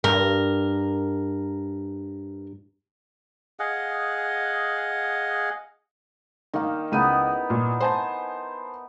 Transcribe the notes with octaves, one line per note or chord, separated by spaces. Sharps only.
G2 A#4
G#4 D#5 F5 F#5
D#3 A#3 D#4 F5
C#2 B3 D#4 E4 D#7
A#2
C5 G#5 A5